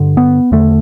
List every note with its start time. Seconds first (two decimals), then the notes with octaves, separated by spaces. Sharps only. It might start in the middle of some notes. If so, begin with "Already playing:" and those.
Already playing: G2 D3
0.17 B3
0.52 E2 D3 A3